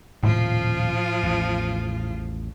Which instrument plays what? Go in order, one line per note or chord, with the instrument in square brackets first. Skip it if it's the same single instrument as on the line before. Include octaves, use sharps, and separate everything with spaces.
[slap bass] D#1 C3 [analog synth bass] A2 [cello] F3 F4
[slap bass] A1 E2